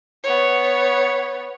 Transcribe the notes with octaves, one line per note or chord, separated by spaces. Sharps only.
B3 C#5